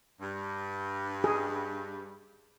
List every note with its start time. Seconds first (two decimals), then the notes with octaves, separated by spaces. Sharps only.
0.22 G2
1.24 G#4